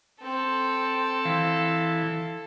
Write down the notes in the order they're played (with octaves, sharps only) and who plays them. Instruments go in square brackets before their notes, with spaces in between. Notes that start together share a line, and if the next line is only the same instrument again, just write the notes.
[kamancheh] C4 [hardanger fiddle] A4
[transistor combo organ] E3 [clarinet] F5